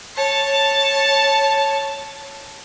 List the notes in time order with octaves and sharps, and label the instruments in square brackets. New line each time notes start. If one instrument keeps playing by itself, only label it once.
[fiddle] C#5 A5